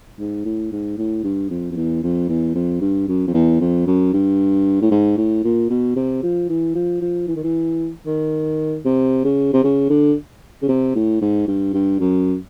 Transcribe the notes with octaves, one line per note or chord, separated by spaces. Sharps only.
G#2
A2
G#2
A2
G2
F2
F2
E2
F2
E2
F2
G2
F#2
F2
E2
F2
F#2
G2
A2
G#2
A2
A#2
B2
C3
F3
E3
F3
F3
E3
D#3
E3
D#3
C3
C#3
C3
C#3
D3
C#3
C3
A2
G#2
G2
G2
F#2